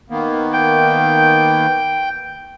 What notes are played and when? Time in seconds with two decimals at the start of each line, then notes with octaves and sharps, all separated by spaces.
0.10 D#3 A#3 B3
0.53 G5